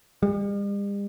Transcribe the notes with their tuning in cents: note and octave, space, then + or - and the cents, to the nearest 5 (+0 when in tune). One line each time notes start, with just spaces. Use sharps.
G3 +45